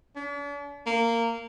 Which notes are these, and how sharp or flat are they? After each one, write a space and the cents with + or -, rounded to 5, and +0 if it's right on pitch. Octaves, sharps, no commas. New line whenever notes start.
D4 -45
A#3 -15